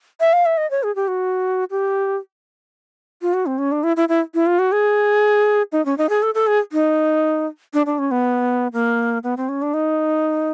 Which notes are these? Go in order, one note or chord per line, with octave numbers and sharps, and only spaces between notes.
E5
F5
E5
D#5
C#5
G#4
G4
F#4
G4
F4
F#4
C4
C#4
D4
E4
E4
E4
E4
F4
F#4
G#4
D#4
C#4
D#4
G#4
A4
A4
G#4
D#4
D4
D4
C#4
B3
A#3
B3
C4
C#4
D4
D#4